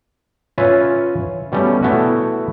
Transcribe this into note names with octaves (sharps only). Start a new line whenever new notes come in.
C#4 F4 B4 C#5 E5 G#5
B2 G3 A3 C#4
A3 B3 E4 F#4